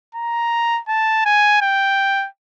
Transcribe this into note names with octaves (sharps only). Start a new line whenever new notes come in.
A#5
A5
G#5
G5